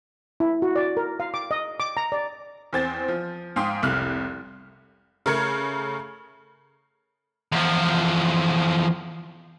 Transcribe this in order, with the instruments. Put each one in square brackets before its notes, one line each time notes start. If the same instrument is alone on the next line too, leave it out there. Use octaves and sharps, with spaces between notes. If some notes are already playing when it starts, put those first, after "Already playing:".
[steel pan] E4
F#4
D5
A#4
F5
D6
D#5
D6
A#5
D5
[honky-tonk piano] E2 C4 A6
F3
G#2 F5 G5 C6 D#6
F1 C2 F6 F#6
C#3 A3 A#4 F6 G#6 C#7
[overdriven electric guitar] E2 F3